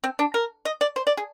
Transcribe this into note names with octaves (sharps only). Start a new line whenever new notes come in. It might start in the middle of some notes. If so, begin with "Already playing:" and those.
C4
D4
A#4
D#5
D5
C5
D5
G#4